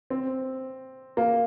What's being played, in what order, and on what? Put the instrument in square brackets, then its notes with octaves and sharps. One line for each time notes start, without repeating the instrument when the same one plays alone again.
[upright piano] C4
A#3